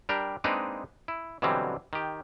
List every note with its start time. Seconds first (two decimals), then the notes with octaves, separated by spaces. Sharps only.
0.09 G3 D4 G4 A#4
0.44 G#3 A#3 C4 D4 D#4 B4
1.08 E4
1.42 B2 D3 E3 F#3 G3 C4
1.93 D#3 G4